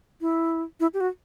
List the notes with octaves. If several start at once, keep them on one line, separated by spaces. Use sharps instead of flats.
E4
E4
G4
F#4